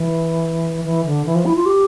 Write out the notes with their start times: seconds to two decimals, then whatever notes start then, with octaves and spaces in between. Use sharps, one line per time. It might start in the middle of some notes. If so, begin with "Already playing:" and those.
Already playing: E3
0.85 E3
1.05 D3
1.26 E3
1.35 F3
1.45 E4
1.56 F4
1.66 G4